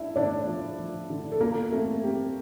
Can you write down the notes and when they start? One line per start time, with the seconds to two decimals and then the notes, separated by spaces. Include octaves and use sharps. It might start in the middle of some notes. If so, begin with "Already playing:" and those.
Already playing: D4 E4 E5
0.16 D3 D4 D5
0.47 F3
0.79 F3
1.10 D3
1.32 A4
1.41 A#3 F4 A#4
1.72 A3 C4 A4
2.03 C4 G4